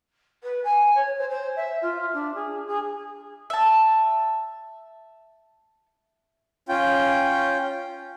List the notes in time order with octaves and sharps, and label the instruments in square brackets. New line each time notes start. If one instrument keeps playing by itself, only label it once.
[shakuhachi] B4
G#5
C#5
C5
C5
E5
F4
D4
G#4
G#4
[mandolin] E5 A5
[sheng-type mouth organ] C#4 F4 G5